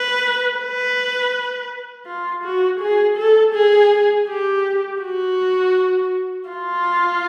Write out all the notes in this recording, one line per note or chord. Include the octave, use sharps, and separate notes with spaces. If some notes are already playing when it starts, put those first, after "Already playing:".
Already playing: B4
B4
F4
F#4
G#4
A4
G#4
G4
F#4
F4